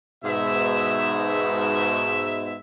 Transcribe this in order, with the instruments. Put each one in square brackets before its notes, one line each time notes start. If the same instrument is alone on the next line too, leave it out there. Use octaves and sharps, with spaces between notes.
[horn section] G#2 B2 E5